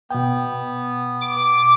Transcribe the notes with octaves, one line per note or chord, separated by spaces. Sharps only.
B2 B3 G5
D6